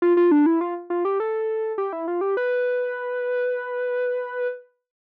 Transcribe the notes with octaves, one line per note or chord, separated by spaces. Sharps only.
F4
F4
D4
E4
F4
F4
G4
A4
G4
E4
F4
G4
B4